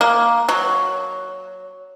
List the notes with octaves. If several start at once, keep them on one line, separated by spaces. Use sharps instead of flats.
A#3
F#3